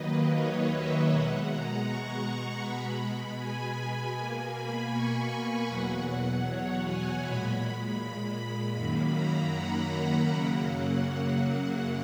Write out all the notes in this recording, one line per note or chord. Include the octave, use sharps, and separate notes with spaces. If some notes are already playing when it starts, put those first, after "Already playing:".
Already playing: D#2 D#3 F#3 A#3 B4 D#5
C#5
E5
B2 G#3 F#5
A#5
C#6
C#6
B2 G#3 B5
G#5
G#5
B2 A#3 G#5
B5
C#6
B5
E2 B2 F#3 F#5
C#5
G#5
A#2 G#3 B5
B5
B5
F#2 D#3 F#3 A#3 B5
A#5
F#5
F#2 C#3 F#3 A#3